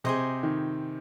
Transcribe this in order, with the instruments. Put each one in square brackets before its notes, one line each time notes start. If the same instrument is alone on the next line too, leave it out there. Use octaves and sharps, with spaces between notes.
[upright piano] C3 [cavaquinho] G#4 C5 D#5
[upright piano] D#3